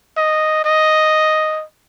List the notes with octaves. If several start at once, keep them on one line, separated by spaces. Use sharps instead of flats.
D#5
D#5